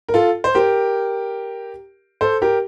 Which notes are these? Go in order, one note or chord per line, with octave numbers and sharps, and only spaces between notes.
A#4
F4 A4
C5
G4 A#4
A4 C5
G4 A#4